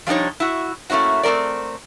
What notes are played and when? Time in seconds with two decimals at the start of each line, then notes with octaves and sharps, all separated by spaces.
0.07 F3 G3 D4 D#4 C#5
0.40 E4 F#4
0.90 A3 A#3 C#4 E4 F#4
1.23 A3 C4 C#4 A#4 D5